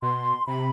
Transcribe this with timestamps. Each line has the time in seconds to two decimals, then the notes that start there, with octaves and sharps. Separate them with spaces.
0.02 B2 C6
0.47 C3 B5